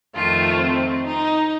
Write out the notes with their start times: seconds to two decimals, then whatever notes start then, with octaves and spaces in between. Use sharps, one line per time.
0.15 F2 D#3 A3 F4
0.61 C4
1.06 D#4